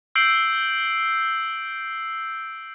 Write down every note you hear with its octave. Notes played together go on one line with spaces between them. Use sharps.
E6 G6 C7 D7 F#7